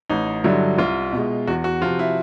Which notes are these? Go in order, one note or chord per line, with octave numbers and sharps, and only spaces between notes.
A1 D#4
G2 D3 F#3 E4
C2 F4
B2 G#3
E2 F#4
F#4
C3 F3 F4
E4